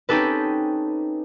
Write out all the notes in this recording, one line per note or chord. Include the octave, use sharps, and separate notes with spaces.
C4 C#4 D#4 G4 A4 B4